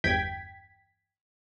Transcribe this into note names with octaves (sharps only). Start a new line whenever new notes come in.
G1 E2 G5 G#6 B6